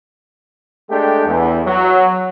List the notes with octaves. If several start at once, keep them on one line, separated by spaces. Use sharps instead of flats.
G#3 A3 D4 G4 G5
E2
F#3